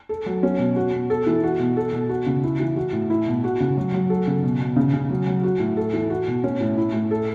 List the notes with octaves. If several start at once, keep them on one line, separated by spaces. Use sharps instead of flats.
A4
F#3
C#4
B2
F#4
B2
A4
E3
F#4
B2
A4
B2
F#4
C#3
E4
E3
F#4
A2
E4
B2
F#4
C#3
F#3
F#3
A4
C#3
B2
B2
C#3
C#3
F#3
F#3
F#4
A2
A4
E3
F#4
B2
C#4
A2
E4
A2
A4